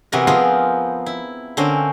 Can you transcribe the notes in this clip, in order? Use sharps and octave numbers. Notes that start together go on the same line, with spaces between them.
C3 E3 B3 F#4 A#4
F3 B3 C4 F4 G#4 A#4
E4
D3 C4 C#4 A#4 C5